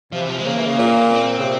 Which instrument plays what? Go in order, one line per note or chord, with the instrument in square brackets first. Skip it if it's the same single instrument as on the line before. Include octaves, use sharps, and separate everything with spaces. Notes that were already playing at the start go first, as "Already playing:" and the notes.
[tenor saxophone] C3 [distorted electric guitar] F3
[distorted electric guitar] E3
F3
G#3
[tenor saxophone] C#3 [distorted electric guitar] A#3
[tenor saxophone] E3
C#3
A#2
[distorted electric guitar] C4
[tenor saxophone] C#3
C3